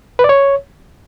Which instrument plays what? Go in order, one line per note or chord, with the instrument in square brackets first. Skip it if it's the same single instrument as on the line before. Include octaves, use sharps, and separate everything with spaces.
[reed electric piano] B4
D5
C#5